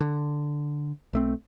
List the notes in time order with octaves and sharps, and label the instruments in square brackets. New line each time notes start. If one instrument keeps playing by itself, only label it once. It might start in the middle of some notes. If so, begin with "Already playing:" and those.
[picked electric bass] D3
B1 A3 C4